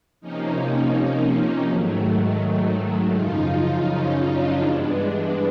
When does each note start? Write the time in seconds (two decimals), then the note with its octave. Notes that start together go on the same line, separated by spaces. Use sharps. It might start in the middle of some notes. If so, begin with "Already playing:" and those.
0.21 C3 F3 A#3 C#4 D#4
1.69 G#2 D#3 F#3 A3
3.15 F#2 C#3 F3 D#4 F4
3.88 C#4 D#4
4.26 D4
4.61 G2 E3 G#3 B3 D4